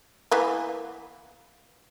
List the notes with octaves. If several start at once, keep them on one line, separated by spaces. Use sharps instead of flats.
E3 A#3 B3